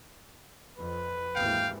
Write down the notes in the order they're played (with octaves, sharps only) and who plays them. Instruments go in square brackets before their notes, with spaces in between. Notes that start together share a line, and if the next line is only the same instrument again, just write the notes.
[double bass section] F2 [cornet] B4
[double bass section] G#1 D#2 E3 [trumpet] F5 [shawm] G5